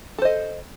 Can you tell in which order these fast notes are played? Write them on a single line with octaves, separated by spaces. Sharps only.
A4 C5 D#5